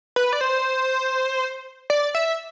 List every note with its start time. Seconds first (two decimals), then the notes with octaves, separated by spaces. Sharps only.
0.16 B4
0.33 D5
0.41 C5
1.90 D5
2.15 E5